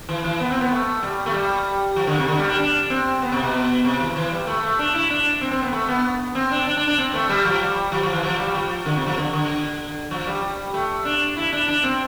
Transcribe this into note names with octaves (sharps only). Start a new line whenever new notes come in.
E3
E3
B3
C4
B3
A3
G3
A3
G3
F3
D3
C3
D3
G3
D4
D4
C4
B3
C3
B2
C3
E3
E3
G3
A3
A3
D4
E4
D4
C4
C4
B3
A3
B3
C4
D4
D4
D4
D4
C4
A3
G3
F3
G3
F3
F3
E3
F3
G3
F3
D3
C3
F3
D3
D3
F3
G3
A3
D4
E4
D4
D4
C4